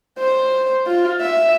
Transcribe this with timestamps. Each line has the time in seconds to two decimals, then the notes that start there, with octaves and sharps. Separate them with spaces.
0.19 C5
0.87 F4
1.21 E5